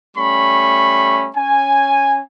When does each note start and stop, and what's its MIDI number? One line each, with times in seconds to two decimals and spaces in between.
0.17 1.29 55
0.17 1.29 57
0.17 1.29 61
0.17 1.29 83
0.17 1.29 85
1.36 2.20 61
1.36 2.20 80